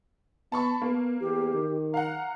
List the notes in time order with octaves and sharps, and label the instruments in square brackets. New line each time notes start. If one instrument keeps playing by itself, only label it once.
[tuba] B3 [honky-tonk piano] A5 B5 C#6
[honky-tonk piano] A#3 [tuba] B3
[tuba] E2 [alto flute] G4
[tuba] D#3
[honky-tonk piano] F5 F#5 [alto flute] A#5